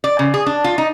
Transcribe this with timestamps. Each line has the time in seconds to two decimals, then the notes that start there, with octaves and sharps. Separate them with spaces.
0.04 D5
0.19 C#3
0.34 G#4
0.46 D4
0.64 F4
0.78 D#4